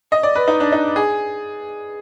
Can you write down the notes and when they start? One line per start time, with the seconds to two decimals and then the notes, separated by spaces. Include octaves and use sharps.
0.12 D#5
0.23 D5
0.36 B4
0.48 D#4
0.60 D4
0.72 D#4
0.96 G#4